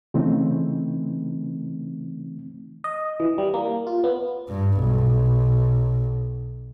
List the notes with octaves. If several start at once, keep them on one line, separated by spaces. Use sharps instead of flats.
C#3 E3 A3 C4 D#4
D#5
E3
G3
A#3
F4
B3
G2
B1